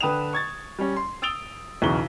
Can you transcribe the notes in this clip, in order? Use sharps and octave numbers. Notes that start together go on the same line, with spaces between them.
D3 B4 G5 D#6 E7 F7
C#6 G#6 A6
G3 C#4
C6
D#6 E6 A6 D7 F7 G7
B1 E2 C#3 C#6 G7